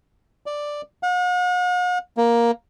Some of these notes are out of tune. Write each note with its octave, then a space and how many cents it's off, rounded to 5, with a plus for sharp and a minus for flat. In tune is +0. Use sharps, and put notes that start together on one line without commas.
D5 +0
F#5 -45
A#3 +10